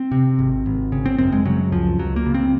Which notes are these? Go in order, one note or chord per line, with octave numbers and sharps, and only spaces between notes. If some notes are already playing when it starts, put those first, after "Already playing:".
Already playing: C4
C3
G#1
G#1
C#3
C4
F#2 C4
G#3
C#3 F#3
C#2 F3
C#2 F#3
A#3
C#3
C4